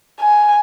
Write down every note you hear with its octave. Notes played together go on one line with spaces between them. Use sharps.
G#5